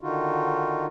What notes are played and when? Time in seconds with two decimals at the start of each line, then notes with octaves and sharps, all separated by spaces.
0.01 D3 D#3 D#4 F4 F#4